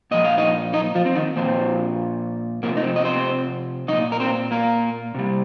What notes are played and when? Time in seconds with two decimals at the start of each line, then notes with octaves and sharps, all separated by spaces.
0.11 A#2 F3 D#5
0.25 F5
0.38 D#4 D#5
0.73 D#4 D#5
0.95 F3 F4
1.06 C4
1.15 D#3 D#4
1.36 A#2 F3 C4
2.63 C3 F3 A#3
2.77 D#4
2.84 C4
2.96 D#5
3.04 C4 C5
3.88 A#2 F3 D#4 D#5
4.12 A#4
4.20 C4 C5
4.51 A#3 A#4
5.15 C3 G3